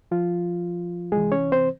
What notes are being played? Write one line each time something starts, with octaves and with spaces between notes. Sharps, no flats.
F3 F4
C2 C3 E3 G#3 G#4
C#4 C#5
C4 C5